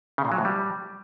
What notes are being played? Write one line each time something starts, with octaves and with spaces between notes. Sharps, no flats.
C#3
A#2
F#3
A2
G3